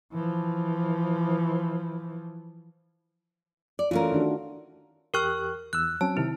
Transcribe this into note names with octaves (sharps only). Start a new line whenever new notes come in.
E3 F3
D5
E3 A3 C#4 F4 A#4
D#3 D4 F#4
E2 G4 A#4 C#6 F6 F#6
E2 E6 F#6
F#3 C4 C#4 A5
C3 D#3 E4